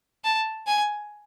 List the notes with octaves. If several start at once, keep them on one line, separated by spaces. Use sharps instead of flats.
A5
G#5